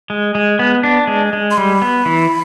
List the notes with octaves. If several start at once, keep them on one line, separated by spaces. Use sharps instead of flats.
G#3
G#3
B3
D4
G#3
G#3
C6
G3 B5
B3
E3